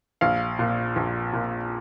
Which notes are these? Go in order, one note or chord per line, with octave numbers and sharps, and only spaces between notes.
A#1 F5
A#2
A#1
A#2